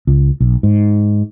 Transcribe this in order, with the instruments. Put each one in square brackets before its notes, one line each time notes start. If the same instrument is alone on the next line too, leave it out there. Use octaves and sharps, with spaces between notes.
[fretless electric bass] C#2
B1
G#2